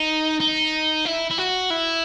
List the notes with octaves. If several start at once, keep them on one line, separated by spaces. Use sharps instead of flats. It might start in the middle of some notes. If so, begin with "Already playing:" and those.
Already playing: D#4
D#4
E4
E4
F#4
E4